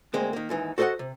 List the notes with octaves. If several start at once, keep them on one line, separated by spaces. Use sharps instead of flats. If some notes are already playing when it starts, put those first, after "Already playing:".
D2 G#3 A#3 C4
D#3 A#3
D#2 G#2 E3 D#4
F#4 A4 C5 D5 D#5 F#5
C3